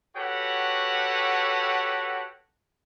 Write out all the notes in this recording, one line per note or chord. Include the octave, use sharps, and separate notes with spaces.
F#4 G4 A4 B4 C#5 F#5